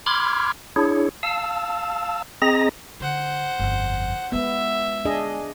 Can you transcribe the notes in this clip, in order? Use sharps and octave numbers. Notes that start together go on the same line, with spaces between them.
B5 C6 D6 F6 G#6
D4 E4 G#4 C#5
F5 A5 E6
C4 G#4 D#5 A#5 A#6
D3 C5 F#5
G1 F2
G#3 B3 F4 E5
D4 G#4 D#5